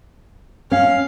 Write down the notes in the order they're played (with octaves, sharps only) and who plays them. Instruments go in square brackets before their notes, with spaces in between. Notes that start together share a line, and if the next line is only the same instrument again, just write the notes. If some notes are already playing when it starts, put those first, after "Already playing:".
[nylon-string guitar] C#4 [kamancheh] F5